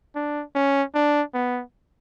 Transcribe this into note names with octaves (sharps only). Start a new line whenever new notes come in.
D4
C#4
D4
B3